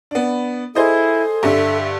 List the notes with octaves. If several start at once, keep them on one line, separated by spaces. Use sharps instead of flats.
B3 D4
E4 G#4 A4 C5 D#5
G2 D3 E5